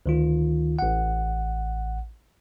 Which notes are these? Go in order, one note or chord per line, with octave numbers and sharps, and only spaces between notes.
D2 D#3 F4
A1 F#5